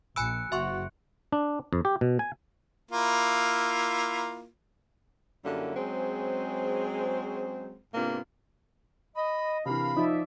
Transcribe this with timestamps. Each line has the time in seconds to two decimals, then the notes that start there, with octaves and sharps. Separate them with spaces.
0.16 A#1 G#5 B5 E6 F#6 C#7 D7
0.52 F#1 F#4 E5 C6 C#6
1.32 D4
1.73 F2
1.85 G4
2.01 B2
2.19 G#5
2.91 A#3 E4 F4
5.45 F#2 D3 G3 A#3 C#4 E4
5.76 F#3 G#3 C4 C#4 G#4 C5
7.94 G#2 C3 A#3 B3 D4 F4
9.16 D#5 B5
9.66 C3 E3 D4 A#4 F5 B5
9.97 F3 D#4 F4 D5 E5